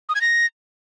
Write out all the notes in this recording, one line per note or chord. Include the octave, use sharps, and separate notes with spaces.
D#6
G#6
A#6